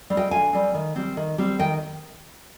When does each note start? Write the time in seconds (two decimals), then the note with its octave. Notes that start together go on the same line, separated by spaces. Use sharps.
0.10 G3 C4
0.17 D#5 G5
0.31 D3 F5 G#5
0.53 G3 C4
0.74 D#3
0.95 G3 C4
1.17 D#3
1.38 G3 C4
1.59 D#3 D#5 G5